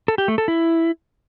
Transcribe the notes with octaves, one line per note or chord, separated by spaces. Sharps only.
A4
G4
A3
A4
E4